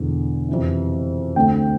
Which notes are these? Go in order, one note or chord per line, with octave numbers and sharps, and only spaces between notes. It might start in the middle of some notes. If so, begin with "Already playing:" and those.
Already playing: E1 E2 D3
F2 C3 E3
D2 D3 A3 C4 G5